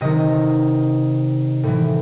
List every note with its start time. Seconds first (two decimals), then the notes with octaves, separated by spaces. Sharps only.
0.01 C3 D#3 D#5
1.63 A2 E3